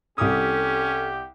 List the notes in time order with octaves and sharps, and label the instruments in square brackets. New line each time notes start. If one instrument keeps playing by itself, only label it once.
[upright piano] C2 D6 D#6 [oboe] C#4 [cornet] G4 [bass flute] A4